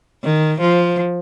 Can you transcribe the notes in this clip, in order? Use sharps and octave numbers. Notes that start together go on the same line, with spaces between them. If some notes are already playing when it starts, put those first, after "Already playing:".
D#3
F3